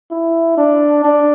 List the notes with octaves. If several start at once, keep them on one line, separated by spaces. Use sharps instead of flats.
E4
D4
D4